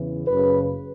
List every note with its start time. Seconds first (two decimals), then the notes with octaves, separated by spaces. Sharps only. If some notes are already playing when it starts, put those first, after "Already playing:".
Already playing: E2 C#3 E3
0.27 F#1 F#2 C#3 B4